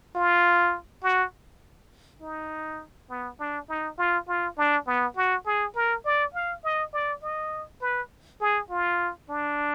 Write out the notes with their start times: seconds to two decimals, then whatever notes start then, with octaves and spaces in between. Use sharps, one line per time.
0.15 F4
1.04 F#4
2.21 D#4
3.10 B3
3.39 D4
3.69 D#4
3.98 F4
4.28 F4
4.57 D4
4.87 B3
5.16 F#4
5.46 G#4
5.75 A#4
6.05 D5
6.34 F5
6.64 D#5
6.93 D5
7.23 D#5
7.81 B4
8.41 G#4
8.70 F4
9.29 D4